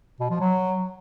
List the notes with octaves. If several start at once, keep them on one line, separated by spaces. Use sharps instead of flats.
B2
F3
F#3